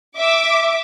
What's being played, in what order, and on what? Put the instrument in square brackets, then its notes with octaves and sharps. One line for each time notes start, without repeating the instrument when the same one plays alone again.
[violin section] E5 D6